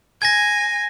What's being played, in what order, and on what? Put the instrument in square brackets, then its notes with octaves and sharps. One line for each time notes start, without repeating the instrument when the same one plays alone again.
[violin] G#5 [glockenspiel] G#6 A#6